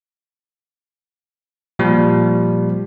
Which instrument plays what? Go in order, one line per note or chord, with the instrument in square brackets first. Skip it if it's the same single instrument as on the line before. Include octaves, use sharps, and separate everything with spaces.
[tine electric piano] A#2 F3 G3